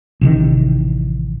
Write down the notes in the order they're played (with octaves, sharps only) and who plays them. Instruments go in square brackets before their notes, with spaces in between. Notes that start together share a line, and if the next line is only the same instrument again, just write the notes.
[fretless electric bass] A1 C3 D#3